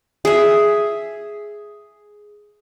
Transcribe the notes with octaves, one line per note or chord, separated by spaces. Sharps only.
G#4 E5